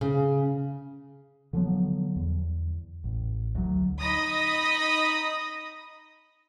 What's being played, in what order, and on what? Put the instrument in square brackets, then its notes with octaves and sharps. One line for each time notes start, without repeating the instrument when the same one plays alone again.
[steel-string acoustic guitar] C#3
[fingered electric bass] D3 F3 F#3 B3
E2
A1
D2 F#3
[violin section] D#4 D#5 B5 D#6 A#6